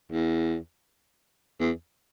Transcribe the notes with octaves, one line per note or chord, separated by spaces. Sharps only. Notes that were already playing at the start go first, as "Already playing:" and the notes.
E2
E2